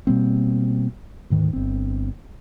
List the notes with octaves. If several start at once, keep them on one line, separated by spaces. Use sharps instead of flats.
B2 G3 A#3 C4
D2 G#2 D#3
G1 C4